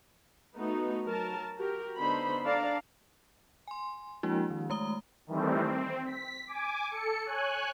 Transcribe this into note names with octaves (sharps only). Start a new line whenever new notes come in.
A3 B3 D#4 F#4
F#3 A#4 A5
F#4 G4 A#4
D3 B3 D#4 C5 B5
D4 A4 D5 F5 A5 A#5
G#5 C6
F3 G#3 A#3 D4 E4 F#4
D#3
G#3 A3 A#5 D#6 G7
D#3 E3 G3 A3 C4
C4
B6
G#5 D6
A4 C#7
C#5 G#5 F#6